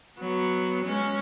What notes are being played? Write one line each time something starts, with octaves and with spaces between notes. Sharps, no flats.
F#3 B3
G#3 C#4